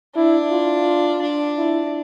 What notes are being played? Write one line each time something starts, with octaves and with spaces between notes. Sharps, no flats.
D4 E4
F4
D4
E4